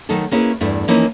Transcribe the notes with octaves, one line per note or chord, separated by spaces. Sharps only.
D#3 F#3 A3 D#4 A4
A#3 C#4 E4 G#4 B4
E2 G2 A3 E4
E3 F3 A#3 C#4 D#4 E4